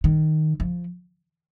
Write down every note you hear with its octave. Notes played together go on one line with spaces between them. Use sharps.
D#3
F3